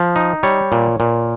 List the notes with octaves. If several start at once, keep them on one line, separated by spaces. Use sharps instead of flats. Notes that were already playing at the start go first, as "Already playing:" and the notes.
Already playing: F3
D#4
G3 C#5
A#2
A#2